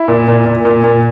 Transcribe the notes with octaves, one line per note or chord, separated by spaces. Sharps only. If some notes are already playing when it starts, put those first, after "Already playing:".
Already playing: E4
A#2
A#2
A#2
A#2
A#2